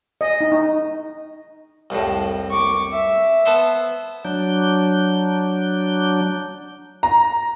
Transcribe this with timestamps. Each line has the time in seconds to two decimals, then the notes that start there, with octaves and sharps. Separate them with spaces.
0.21 D#5
0.41 D#4
0.52 D#4
1.90 C2 F2 A2
2.51 C#6 D6
2.92 E5
3.46 B3 A4 C5
4.25 F#3 D4 G6
7.03 A#5